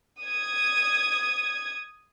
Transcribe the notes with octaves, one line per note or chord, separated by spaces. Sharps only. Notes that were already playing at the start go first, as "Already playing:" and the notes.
D#6 G#6